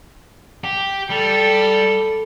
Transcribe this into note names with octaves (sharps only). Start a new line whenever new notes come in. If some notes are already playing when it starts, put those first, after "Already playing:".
G4
G3 A4